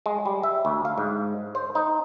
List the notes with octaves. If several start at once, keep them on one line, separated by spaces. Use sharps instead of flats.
G#3
G3
E5
D2
F5
G#2
C5
D#4